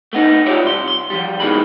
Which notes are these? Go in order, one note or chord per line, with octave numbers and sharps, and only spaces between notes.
A3 B3 D#4
E4 F4 G4 C#5 D5
C2 C6
C6
F3 G3
D#2 B2 D#3 E3 G#3 B5